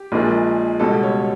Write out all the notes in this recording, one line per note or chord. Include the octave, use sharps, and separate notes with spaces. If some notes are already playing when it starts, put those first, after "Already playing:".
Already playing: G4
A#1 A#2 F3 G#3
C#2 B2 G3 A4
C#5